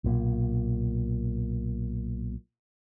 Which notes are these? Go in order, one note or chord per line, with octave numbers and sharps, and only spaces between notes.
B1 A#2